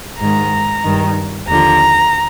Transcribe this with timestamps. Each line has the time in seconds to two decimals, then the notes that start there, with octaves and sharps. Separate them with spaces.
0.20 G#2 D#3 A#5
0.84 G2 D#3
1.48 D#2 D3 F3 A#5